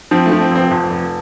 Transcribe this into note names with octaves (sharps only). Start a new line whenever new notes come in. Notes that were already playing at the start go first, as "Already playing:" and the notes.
F3 C4
A3
F3
C4
F1 C4
F2
F1